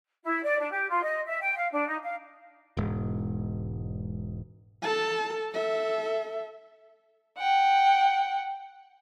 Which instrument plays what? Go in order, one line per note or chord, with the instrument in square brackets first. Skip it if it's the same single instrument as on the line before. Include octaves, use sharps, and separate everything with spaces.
[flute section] E4
D5
D4
G4
F4
D#5
E5
G5
F5
D4
D#4
F5
[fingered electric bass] E1 G#2
[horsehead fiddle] A4 A5
A4 E5
[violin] F#5 G5